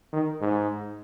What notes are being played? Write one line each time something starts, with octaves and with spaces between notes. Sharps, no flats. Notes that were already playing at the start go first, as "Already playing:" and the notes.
D#3
G#2